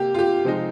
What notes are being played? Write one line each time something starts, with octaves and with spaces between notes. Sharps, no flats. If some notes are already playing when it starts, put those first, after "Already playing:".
Already playing: C3 A#3 G4
F4
G4
C3 F3 G#3 D#4